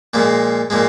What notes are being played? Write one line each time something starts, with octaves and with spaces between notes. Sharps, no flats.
A#2 F3 G#3
A#2 F3 G#3